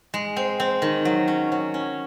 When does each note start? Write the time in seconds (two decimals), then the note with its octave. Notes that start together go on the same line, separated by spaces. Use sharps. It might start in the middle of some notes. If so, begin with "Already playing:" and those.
0.14 G#3
0.37 C4
0.60 C4
0.82 D#3
1.05 F#3
1.28 C#4
1.52 F#3
1.74 C#4